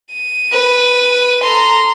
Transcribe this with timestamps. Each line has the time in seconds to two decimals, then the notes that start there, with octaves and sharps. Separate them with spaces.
0.12 D#7
0.52 B4
1.42 A4 A#5 C6